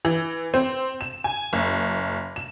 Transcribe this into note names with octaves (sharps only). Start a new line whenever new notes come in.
E3
C4
E7
G#5
F#1
E7